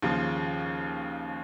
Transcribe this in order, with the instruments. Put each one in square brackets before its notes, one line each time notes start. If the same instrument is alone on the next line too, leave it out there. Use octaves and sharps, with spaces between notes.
[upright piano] D#2 C#3 F3